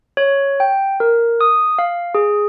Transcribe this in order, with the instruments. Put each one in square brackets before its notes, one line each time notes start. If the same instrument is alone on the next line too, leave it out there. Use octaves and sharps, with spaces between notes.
[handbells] C#5
G5
A#4
D#6
F5
G#4